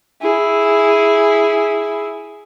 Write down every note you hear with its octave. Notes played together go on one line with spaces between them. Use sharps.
E4 G#4